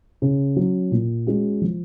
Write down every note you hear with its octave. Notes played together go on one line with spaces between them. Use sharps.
C#3
F#3 C#4
A#2
G#3 C#4 F#4
F3